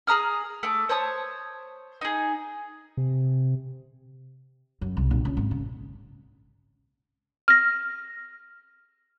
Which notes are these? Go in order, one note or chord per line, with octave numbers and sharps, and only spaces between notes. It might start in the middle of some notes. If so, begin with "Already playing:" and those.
G#4 A#5 D#6 F6
A3 D6
C5 C#5 A5 D#6
D#4 G#4
C3
F#2
C2
A#1
C#2
G#1
C#3
F6 A#6